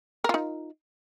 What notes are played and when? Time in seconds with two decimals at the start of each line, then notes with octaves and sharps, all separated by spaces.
0.24 A#4
0.29 F4
0.34 D#4